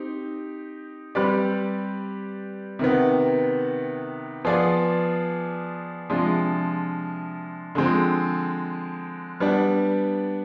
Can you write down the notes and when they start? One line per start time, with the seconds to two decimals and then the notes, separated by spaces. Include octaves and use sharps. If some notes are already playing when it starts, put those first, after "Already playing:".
Already playing: C4 D#4 G4
1.15 G3 C4 G4 B4 D5
2.79 C3 D#3 B3
4.45 F3 B3 F4 G#4 D5
6.10 C3 F3 G#3 D4 F4
7.75 D3 F3 G#3 C4
9.40 G3 B3 D4